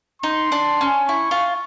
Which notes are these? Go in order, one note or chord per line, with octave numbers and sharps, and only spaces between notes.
D#4 C6
D4
C#4
E4 C#6
F4